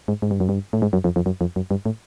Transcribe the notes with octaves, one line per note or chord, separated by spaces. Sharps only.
G#2
G#2
G2
F#2
G2
A2
G#2
F#2
F2
F2
F#2
F2
F#2
G2
A2